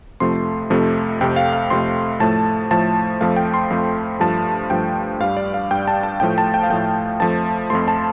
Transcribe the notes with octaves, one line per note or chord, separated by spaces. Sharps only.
F2 C3 F3 A3 C6
F2 C3 F3 A3
F2 C3 A3 G5
F5
F5
F2 C3 A3 C6
A2 F3 A3 A5
A2 F3 A3 A5
F2 F3 A3 F5
G5
C6
F2 F3 A3
G2 F3 A3 A5
G2 F3 A3 G5
G2 G3 F5
D5
F5
G2 G3 G5
A5
A5
A2 F3 A3 G5
A5
G5
F5
A2 F3 A3 G5
F2 F3 A3 A5
F2 F3 A3 C6
A5